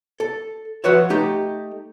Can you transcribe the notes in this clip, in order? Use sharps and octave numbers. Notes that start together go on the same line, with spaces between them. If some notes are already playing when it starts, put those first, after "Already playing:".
A4
F3 F#4 B4 C#5 E5
A3 D#4 G4